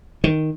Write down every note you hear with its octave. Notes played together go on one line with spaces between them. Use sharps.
D#3